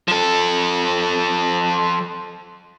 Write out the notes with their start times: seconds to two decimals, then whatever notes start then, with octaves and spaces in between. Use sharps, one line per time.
0.08 F3 A4